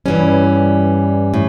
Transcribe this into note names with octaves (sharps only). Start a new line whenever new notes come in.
G2 E3 G3 C#4
A2